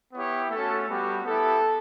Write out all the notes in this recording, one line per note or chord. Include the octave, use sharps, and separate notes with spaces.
B3 E4 G4 C#5
A3 C#4 F#4 A4
G3 B3 F#4 G4
B3 E4 G4 A4